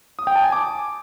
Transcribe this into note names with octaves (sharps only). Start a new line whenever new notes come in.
D#6
G5
A5
G#5
D6